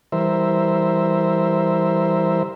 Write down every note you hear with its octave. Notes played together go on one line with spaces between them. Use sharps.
E3 G3 A#4 C5 E5